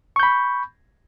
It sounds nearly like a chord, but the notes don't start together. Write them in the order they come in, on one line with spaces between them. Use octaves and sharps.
C#6 G6 B5